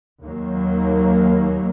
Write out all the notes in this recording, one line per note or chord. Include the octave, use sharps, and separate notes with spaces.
D#2 D#3 F#3 A#3